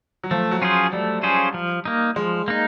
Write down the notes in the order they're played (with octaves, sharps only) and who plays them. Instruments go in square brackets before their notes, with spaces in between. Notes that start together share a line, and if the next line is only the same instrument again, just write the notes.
[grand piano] F#3
[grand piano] F3 [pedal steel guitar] A3
[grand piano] F#3
[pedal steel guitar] C#4 F4 G#4 C5
[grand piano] G3 [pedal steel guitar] A3
[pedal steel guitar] C#4 F4 G#4 C5
F3
A#3 D#4
[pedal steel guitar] F3 [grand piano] G#3
[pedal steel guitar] A#3 D#4